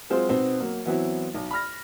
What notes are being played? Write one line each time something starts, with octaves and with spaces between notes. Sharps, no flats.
F#3 G#3 C4 F4 C5
B2 B3 C4 D#4
F#3 A#3
E3 F#3 B3 C4 E4 F#4
B1
B5 F6 A#6